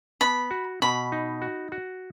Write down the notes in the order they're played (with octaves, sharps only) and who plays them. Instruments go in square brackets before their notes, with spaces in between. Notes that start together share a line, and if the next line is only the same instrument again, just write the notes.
[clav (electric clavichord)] B3 [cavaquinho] B5
[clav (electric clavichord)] F#4
[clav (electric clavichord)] B2 [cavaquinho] B5
[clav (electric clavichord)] D#4
F#4
F#4